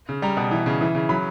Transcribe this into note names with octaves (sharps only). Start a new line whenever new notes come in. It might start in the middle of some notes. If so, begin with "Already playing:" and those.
C#3
G3 A#5
B2
E3
C#3
E3
C#3
F#3 B5